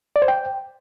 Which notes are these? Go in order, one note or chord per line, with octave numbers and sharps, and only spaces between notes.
D5
C5
G5